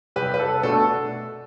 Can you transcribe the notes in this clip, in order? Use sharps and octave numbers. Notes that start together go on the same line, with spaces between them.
C2 G4 B4
B4
A4
B2 A3 D4 A4